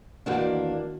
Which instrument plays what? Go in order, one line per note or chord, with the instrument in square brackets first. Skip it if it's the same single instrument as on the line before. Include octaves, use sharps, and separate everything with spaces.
[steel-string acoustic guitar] E2 A#3 D4 [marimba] D#3 F#4 F#5